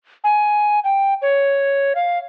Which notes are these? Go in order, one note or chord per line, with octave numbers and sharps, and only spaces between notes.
G#5
G5
C#5
F5